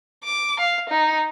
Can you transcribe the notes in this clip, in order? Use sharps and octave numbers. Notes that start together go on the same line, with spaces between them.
D6
F5
D#4